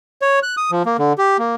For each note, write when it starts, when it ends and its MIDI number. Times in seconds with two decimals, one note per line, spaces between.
0.22 0.39 73
0.43 0.55 90
0.57 0.71 87
0.71 0.83 53
0.86 0.97 58
0.99 1.13 50
1.18 1.37 67
1.39 1.56 58